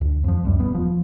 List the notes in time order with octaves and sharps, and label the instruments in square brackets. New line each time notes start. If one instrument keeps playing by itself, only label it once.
[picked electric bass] D2
F2 F3
C#2 F#2 G3
D#1 B3
F3